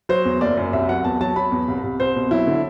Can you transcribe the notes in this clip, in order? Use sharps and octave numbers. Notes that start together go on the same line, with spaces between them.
F#3 C5
E2
F#1 D5
F#2
C2 E5
F#3 F#5
E2 A5
F#3 A5
F#3 B5
E2
C2
C2
C2 C5
B2
F#3 E4
D3